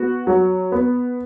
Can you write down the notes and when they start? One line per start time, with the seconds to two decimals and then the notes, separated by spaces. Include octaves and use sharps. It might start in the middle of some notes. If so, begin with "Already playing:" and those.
Already playing: B3 F#4
0.27 F#3
0.72 B3